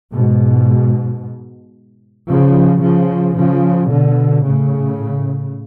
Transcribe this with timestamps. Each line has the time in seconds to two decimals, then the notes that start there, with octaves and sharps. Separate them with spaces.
0.12 G#2 B2
2.29 C#3 F3
2.83 C#3 F3
3.37 C#3 F3
3.91 B2 D3
4.45 A2 C#3